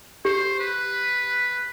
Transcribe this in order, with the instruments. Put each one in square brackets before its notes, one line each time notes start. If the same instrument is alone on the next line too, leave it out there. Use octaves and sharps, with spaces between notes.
[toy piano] G4 [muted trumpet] C5
[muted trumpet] B4